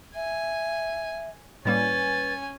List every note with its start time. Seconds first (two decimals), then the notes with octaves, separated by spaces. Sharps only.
0.15 E5 G#5
1.65 A2 G3 A#3 C#4 B4 G#5 A6